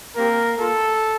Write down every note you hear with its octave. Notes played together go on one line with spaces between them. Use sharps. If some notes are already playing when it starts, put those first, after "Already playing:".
A#3 C4 G4 A#4
A#3 F4 A4